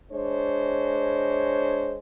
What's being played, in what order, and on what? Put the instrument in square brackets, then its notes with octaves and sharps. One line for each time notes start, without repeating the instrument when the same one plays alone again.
[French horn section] G#3 D4 C5 C#5